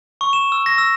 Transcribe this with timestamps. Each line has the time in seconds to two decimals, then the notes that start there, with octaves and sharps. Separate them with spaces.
0.21 C#6
0.33 E7
0.52 E6
0.66 A#6
0.78 E6